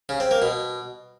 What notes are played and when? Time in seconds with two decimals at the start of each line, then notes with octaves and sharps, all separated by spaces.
0.09 C#3
0.20 C4
0.31 A#3
0.42 B2